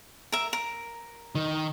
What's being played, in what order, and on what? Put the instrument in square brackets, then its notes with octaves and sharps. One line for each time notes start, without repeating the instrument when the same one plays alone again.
[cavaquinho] A#4 E5
A#4
[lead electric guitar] D#3